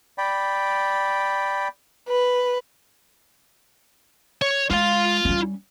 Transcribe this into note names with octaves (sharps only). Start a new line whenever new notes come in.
D5 G5 B5
B4
C#5
G#3 F4 F5
G3 C#4